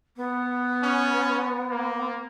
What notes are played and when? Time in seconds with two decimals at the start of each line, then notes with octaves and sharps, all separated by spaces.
0.16 B3
0.83 C#4
1.70 A#3